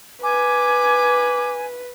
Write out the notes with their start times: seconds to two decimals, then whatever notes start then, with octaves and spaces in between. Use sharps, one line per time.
0.23 B4 G#5 D6